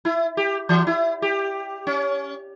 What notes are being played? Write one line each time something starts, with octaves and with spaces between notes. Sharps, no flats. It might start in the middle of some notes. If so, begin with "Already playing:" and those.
E4
G4
E3
E4
G4
C#4